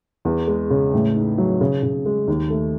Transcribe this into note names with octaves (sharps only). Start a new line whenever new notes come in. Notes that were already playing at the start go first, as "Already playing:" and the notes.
E2
G#3
C#3
A2
D#4
F#3
C#3
C#3
G#3
D#2
A3